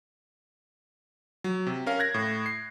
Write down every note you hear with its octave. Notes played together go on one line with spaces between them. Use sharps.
F#3
C3
C#4 A#4 F5
F#6 G#6 A#6
A2
C7